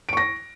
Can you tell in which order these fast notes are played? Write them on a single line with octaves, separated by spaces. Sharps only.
D7 C#6 A#6